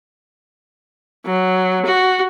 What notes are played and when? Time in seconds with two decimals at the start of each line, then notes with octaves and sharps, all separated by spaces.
1.26 F#3
1.85 F#4